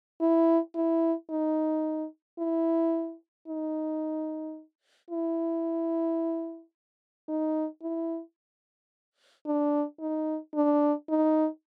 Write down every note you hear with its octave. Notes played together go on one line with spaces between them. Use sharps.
E4
E4
D#4
E4
D#4
E4
D#4
E4
D4
D#4
D4
D#4